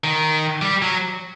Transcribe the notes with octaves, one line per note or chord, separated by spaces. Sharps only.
D#3
G3
F#3